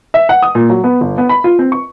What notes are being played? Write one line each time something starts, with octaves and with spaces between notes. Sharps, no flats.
E5
F#5
D#6
A#2
F#3
B3
G1
B3
B5
F4
C4
C#6